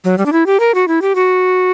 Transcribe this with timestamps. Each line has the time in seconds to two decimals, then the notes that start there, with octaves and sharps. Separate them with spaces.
0.04 F#3
0.18 G3
0.26 D4
0.33 E4
0.46 G4
0.60 A#4
0.75 F#4
0.88 E4
1.02 G4
1.15 F#4